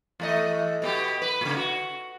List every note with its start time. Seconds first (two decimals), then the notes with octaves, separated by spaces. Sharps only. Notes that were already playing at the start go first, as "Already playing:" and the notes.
0.20 E2 A3 D#5
0.82 B2 B3 G4
1.22 B4
1.41 A#2 C#3
1.57 F#4